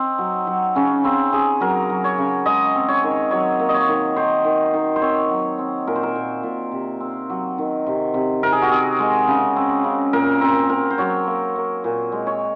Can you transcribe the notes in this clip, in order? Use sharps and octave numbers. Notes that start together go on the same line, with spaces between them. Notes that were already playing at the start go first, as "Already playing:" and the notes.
Already playing: C4 D#4
F#3
F#3
C#3 C#4
C#3 C4
C#3 G#4
F#3 A#4
F#3
C#5
C#3
G#3 D#5
C4
C#5
D#3
F#3 C#5
A#3
D#5
C#5
D#3
D#3 C5
D#3
D#3
C5
C4 C#5
F#3
C4
A#2 A#4
C5
A#4
A#2
A#2
C3
C4
F#3
D#3
C3
C3
C3 A#4
G#4
F#4
C4 G#4
G#3
C#3
C4
C#3
A#2 A#4
C4 A#4
C4 A#4
C5
F#3 C#5
A#3
A#3
A#2
G#3
C#5